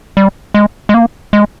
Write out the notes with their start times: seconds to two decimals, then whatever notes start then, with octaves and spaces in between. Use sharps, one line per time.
0.17 G3
0.54 G#3
0.89 G#3
0.94 A#3
1.33 G#3